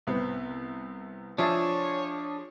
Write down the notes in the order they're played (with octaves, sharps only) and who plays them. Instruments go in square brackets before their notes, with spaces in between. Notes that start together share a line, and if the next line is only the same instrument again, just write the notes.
[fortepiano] C2 B3 C4
[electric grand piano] F3 F4 [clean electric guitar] D4 G#4 [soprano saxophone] C#5 [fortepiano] E5 A5